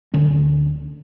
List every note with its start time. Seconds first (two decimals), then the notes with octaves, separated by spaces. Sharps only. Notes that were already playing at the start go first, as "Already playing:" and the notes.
0.14 D1 D3 C#4